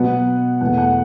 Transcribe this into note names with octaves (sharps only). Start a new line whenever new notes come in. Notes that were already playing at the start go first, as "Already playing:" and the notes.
Already playing: B2 F#3 B3 F#5
E2 B2 A3 F#5
F#5